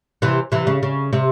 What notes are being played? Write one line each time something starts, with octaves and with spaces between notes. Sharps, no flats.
C3 E3
C3 E3
C#3
C#3
C3